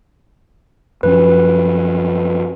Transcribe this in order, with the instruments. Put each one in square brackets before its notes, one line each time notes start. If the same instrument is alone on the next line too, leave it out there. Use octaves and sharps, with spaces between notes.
[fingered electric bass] F#2 F3 C#4 [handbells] B4